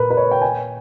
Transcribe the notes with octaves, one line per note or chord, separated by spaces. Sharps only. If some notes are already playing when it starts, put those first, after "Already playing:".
Already playing: A#2 A#4 B4
B4
C#5
G5
G#5